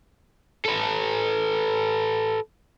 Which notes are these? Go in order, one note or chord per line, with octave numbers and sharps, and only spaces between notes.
A4 B4